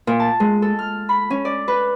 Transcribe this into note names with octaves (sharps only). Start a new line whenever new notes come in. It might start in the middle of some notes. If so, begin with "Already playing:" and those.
A#2
A5
G#3
A4
F6
B5
C#4
D5
B4